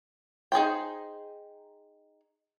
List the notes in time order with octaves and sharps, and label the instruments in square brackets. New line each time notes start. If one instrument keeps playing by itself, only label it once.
[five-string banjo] D#4 G#4 C5 G5